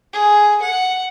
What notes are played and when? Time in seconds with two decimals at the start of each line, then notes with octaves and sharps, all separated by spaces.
0.13 G#4
0.62 F#5